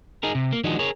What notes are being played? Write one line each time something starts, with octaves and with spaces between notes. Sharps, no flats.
D#4 G#4 A#4
C3
A#3
D#3 F3 G#3 D4 D#4 F#4
G#4 A#4 C#5